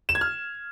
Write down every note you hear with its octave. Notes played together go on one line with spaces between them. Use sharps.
E7
G#6
F6